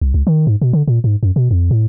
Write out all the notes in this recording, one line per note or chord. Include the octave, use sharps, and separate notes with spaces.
C2
C#2
D#3
G#2
B2
D3
A#2
G#2
F#2
B2
F2
A2